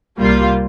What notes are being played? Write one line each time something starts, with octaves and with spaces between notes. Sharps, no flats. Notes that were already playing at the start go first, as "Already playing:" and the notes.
C2 A#2 G3 A#3 F4